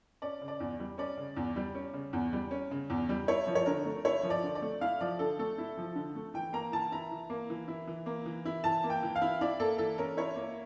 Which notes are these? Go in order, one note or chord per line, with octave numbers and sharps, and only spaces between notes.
C#4 D5
C#3
D5
E2
G3
C#4 D5
C#3
E2
G3
C#4
C#3
E2
G3
C#4
C#3
E2
G3
E4 C#5
F3
C#5
D3 A#4
A3
E4 C#5
F3
D5
D3
D5
A3
E4 F5
F3 D5
D3 A4
A3 A4
E4
F3
D3
A3
E3 G5
A#3 A#5
E3 A5
E4 A#5
E3
A#3
E3
E4
E3
A#3
E3
E4
E3 A5
A#3
G5
E3
F5
E4
E4 D5
A#3 A4
E3 A4
C#4 A#4
E4 C#5
A#3